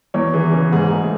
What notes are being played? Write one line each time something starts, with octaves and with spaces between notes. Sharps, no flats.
E2 C#5
E3 G#4
C#3
G#2 G#4
A3